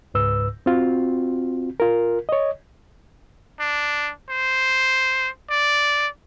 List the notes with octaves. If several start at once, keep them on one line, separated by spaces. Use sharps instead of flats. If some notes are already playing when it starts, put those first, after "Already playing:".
C#2 G#2 B4 E6
C4 F4 F#4
F4 A#4
C#5 D#5
D4
C5
D5